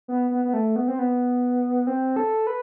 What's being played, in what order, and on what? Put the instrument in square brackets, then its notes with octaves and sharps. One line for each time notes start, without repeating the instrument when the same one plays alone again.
[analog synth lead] B3
B3
B3
A3
B3
C4
B3
C4
A4
B4